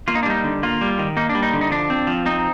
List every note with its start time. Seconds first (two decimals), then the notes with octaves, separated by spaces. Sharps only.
0.08 A#3 F4
0.15 D#4
0.23 D4
0.26 G3 D#4
0.44 D3
0.63 A#3 F4
0.81 G3
0.99 D#3
1.17 A#3 D#4
1.29 D4
1.35 G3
1.42 D#4
1.53 D3
1.61 D#4
1.71 F3 D4
1.90 C4
2.07 F3
2.26 C4 D#4